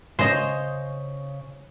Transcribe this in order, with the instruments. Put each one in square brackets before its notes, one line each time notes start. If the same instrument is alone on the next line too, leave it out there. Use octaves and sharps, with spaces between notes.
[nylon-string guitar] C#3 C#5 [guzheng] C5 D#5 C6